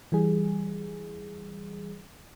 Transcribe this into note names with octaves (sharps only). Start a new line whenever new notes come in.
E3 G3 G#4